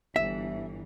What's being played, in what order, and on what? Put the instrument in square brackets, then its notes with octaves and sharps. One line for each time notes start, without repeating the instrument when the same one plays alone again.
[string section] G1 E3 [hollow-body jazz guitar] E5